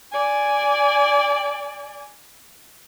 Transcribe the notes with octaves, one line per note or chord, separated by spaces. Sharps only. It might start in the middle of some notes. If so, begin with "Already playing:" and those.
D5 G#5